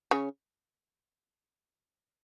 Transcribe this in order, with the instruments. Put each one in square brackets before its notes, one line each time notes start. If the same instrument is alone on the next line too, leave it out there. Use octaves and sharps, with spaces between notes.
[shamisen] C#3 C#4